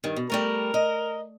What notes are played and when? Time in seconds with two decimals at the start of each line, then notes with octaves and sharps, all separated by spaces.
0.04 G2 D#3
0.16 B2
0.30 G3 A3 A#4 A#5
0.74 D#5